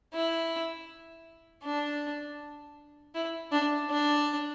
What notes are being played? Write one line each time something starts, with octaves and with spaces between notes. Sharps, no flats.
E4
D4
E4
D4
D4